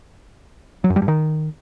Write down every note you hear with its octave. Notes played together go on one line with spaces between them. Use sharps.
F#3
F#2
G3
G2
D#3